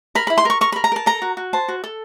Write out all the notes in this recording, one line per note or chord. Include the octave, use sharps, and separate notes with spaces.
A#4 B5
E4 B5
C6
A#4 C#6
A#4 C#6
B5
A#4
A#5
A#4 A5
A4 A#5
F#4
F#4
C5 A5
F#4
A4